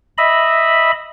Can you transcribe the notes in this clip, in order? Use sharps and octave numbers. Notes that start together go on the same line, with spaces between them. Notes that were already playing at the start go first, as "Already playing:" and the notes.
D#5 E5 B5